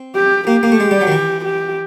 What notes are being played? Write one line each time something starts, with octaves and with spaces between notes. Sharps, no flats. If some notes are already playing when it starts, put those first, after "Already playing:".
Already playing: C4
G4
A#3 G4
A#3
A3
G#3
G3
F#3
D#3
E3
G4